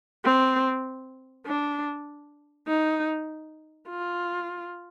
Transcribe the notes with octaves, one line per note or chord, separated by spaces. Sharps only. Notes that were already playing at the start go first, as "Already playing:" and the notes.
C4
D4
D#4
F4